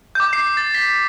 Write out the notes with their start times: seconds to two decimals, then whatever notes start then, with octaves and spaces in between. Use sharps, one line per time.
0.15 D6 G6
0.33 C7
0.57 A6
0.75 B6